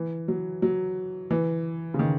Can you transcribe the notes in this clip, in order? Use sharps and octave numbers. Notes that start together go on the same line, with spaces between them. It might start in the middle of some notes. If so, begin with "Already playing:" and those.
Already playing: E3
F#3
F#3
E3
C#3
D#3